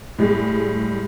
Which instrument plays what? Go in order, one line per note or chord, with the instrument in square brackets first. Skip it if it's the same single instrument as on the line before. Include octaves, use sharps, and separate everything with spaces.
[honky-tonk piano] A2 G3 G#3